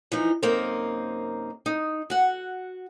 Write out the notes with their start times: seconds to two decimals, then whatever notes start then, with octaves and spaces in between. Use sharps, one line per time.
0.12 E3 F3 D#4
0.43 F#2 C3 A#3 C4 D#4 C5
1.66 D#4
2.10 F#4 F#5